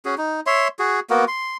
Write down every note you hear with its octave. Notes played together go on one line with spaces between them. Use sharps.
C#4 F#4 G#4
D#4
C#5 E5 C6
F#4 G#4
A#3 B3 F#4 A#4
C6